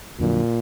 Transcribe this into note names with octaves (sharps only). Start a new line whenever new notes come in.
F2 A#2 D3 F#3